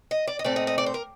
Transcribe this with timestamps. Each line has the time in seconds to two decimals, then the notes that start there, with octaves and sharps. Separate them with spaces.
0.11 D#5
0.27 D5
0.39 D#5
0.44 A#2 A3 C4 D5
0.56 D#5
0.67 D#5
0.78 D5
0.86 C5
0.94 A#4